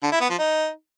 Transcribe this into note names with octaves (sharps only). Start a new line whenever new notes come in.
D3
E4
B3
F3
D#4